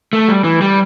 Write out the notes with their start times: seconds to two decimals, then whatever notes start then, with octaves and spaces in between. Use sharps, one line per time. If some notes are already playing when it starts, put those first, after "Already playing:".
0.13 A3
0.28 G3
0.44 E3
0.62 G3